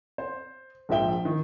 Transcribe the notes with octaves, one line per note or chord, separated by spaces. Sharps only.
C5
A#1 G#2 F3 E5 G5 G7
D#3